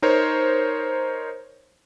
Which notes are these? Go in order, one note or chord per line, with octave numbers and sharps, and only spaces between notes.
D#4 A#4 C5 C#5